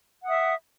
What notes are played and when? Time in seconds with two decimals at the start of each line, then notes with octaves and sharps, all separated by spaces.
0.23 F#5
0.26 D#6
0.28 E5